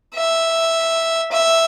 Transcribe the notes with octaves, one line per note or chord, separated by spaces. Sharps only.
E5
E5